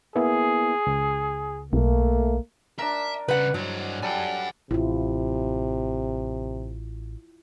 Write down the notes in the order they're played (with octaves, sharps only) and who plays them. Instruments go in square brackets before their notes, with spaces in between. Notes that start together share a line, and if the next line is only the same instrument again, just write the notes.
[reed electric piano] A#3 B3 E4 [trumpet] G#4
[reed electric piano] C#2
[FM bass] B1 [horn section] A3 A#3
[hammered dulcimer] D4 A#4 [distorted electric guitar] E5
[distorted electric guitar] C#3 G3 [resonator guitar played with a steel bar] B4 F#5
[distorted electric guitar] G2 C5 [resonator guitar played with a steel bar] F#3
[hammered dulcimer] G3 A4 [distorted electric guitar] F#5 G#5
[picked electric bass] A1 [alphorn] C3 [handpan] E4 F4